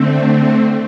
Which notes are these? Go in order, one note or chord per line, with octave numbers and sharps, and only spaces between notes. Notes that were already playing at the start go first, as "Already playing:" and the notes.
Already playing: D3 A3 C4